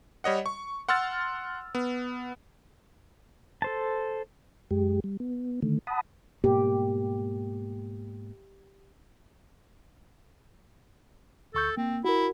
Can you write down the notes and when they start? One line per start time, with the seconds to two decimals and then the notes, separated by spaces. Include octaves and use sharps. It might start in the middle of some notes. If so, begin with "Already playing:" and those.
0.24 G3 C#5 D#5 F#5
0.46 C#6
0.89 F#5 C6 E6 F6 A6
1.75 B3
3.62 A4 C5 A5
4.71 F#2 G#3 G4
5.04 G3
5.20 B3
5.63 D3 D#3 A3
5.87 F#5 A5 B5 D#6
6.44 G#2 B2 A#3 G4
11.55 D2 A4 C#6 G6
11.77 A#3 C4
12.05 E4 F#4 A#4